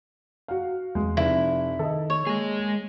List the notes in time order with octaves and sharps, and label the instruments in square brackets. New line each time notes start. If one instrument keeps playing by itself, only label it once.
[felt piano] F#4 F5
[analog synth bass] E2 [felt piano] G#3
[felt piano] F1 [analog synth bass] F2 [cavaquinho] E4
[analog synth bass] D#3 [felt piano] A4 D#5
[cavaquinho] C#5
[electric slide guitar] G#3 G#4 [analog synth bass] A#3